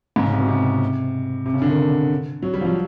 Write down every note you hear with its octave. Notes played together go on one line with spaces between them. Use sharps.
G#2
C#3
C3
B2
C3
C3
C#3
D3
D#3
F#3
G3
F3
F#3